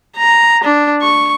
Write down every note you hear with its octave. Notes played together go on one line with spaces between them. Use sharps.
A#5
D4
C#6